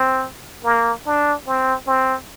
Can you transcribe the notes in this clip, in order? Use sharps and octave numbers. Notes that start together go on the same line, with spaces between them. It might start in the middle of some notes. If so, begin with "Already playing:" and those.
Already playing: C4
A#3
D4
C4
C4